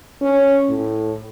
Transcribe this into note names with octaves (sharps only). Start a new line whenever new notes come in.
C#4
A2